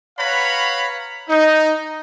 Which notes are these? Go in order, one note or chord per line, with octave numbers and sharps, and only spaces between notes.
B4 C#5 F5 F#5 A#5 B5
D#4